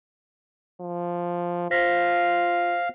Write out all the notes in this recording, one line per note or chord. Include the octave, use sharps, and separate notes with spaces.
F3
F4 C5 F5 A#6 B6